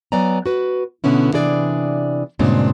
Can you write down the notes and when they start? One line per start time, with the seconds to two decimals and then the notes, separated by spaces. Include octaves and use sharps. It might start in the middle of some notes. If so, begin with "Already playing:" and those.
0.12 F#3 B3 D5 G#5 A#5
0.46 F#4 B4
1.04 B2 D3 B3 C#4 E4
1.33 C3 E3 D4 G#4 D5
2.39 G2 A#2 C#3 G#3 C4 D4